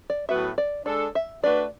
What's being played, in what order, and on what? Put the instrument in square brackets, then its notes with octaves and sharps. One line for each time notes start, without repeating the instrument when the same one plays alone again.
[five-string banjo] D5
[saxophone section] A2 F#3 B3 F#4 B4 [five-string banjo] E5
[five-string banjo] D5
[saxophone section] G#3 D4 A4 [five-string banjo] D5
[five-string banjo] E5
[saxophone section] A3 D4 F#4 B4 [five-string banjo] D5